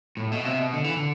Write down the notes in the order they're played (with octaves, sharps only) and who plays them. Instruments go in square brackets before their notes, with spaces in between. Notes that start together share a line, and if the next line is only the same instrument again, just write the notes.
[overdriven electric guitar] A2
B2
C3
B2
D3
E3
D3